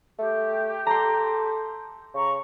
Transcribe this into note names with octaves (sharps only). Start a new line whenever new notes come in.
A3 G4
A4 A#5 C6
C#3 A#5 C#6